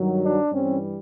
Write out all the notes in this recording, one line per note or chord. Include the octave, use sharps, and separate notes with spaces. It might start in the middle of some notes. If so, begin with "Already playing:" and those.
Already playing: G2 D#3 F#3
D4
G2 E3 G3 C4 C#4